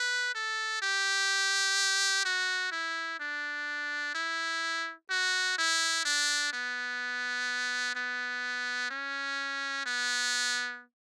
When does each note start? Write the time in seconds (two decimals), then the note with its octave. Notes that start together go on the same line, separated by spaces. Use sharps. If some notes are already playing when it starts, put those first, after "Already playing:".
Already playing: B4
0.35 A4
0.82 G4
2.25 F#4
2.72 E4
3.20 D4
4.15 E4
5.10 F#4
5.58 E4
6.05 D4
6.53 B3
7.95 B3
8.90 C#4
9.86 B3